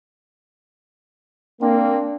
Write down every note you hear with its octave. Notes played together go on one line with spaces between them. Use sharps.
A#3 C4 D4